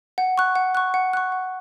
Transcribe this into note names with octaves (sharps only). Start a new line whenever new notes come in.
F#5
C#6 F#6
F#5
C#6 F#6
F#5
C#6 F#6
F#5